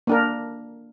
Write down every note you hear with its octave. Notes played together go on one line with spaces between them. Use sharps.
A#3 D4 A#4